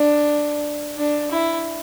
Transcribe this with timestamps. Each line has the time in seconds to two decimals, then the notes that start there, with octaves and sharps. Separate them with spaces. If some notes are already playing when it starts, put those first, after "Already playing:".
Already playing: D4
0.97 D4
1.31 E4